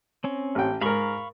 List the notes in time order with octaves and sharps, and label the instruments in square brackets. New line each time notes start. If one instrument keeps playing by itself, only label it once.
[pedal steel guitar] C4 C#4
[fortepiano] A1 G5
[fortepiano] G#2 A#4 [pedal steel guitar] F5 B5 C#6